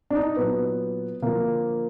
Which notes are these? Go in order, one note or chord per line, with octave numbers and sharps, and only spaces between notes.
D4
D#4
A#2 F#3 B3
D3 F3 A#3